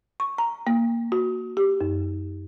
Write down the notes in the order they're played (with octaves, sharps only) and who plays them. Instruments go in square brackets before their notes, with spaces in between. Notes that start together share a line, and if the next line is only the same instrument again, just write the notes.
[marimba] C#6
A#5
A#3
F#4
G4
F#2